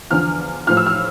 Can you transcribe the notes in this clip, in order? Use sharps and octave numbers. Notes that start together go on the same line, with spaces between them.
E2 D3 F3 F6
A2 F3 F6
E6
F6